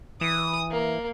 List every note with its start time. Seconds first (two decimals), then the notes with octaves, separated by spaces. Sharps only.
0.21 E3 D#6
0.71 A#3